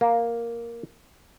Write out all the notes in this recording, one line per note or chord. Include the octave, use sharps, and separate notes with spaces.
A#3